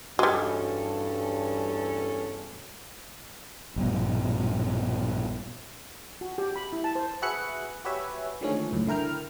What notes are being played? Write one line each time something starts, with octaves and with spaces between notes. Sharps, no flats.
E2 G2 G3 G#3 C#4 F#4 A4
A#1 G2 B2
F#4
G4
B5
E4
A5
C5
F#4 G#4 B4 E5 F#6 C#7
F#4 G4 B4 C#5 E5 G#5
D3 D#3 F3 G#3 A3 C#4
C#2 F#2 A2
D3 E4 A#4 G5 F6